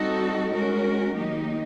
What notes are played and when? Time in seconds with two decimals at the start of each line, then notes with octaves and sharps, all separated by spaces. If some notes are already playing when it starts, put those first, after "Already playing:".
Already playing: G3 C4 D#4 F#4 A4
0.51 G#3 C#4 F#4 A#4
1.15 D#3 F#3 A#3 D#4 G4